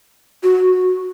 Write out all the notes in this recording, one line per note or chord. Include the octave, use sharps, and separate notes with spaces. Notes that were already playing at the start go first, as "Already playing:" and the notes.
F#4